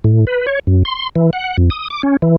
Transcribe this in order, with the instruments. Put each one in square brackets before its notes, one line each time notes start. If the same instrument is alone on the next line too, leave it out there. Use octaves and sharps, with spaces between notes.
[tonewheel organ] A2
B4
C#5
F#2
C6
E3
F#5
F2
D#6
D6
C#4
E3